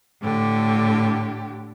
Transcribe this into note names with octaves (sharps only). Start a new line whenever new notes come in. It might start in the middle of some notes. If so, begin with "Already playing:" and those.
A2 D3 G4